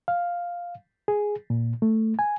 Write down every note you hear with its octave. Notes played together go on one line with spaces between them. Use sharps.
F5
G#4
A#2
A3
G#5